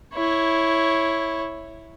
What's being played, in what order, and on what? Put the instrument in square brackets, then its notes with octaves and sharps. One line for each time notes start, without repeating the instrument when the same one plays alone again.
[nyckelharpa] E4 C#5